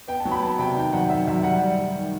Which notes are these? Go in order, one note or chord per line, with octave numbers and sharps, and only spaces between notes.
B3 G5
A5
F#3
B5
B3 A5
C3 G5
D#3 G5
F#2 F#5
D#3 E5
F#2 E5
G3 F#5
G3
G3
D#3